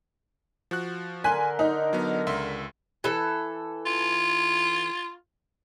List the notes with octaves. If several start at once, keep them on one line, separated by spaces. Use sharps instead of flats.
F3 F#4 F#6
D3 A#4 G#5 C6 F#6 B6
D#4
F#3 B3
C#2 E5 C6
E3 A4
F4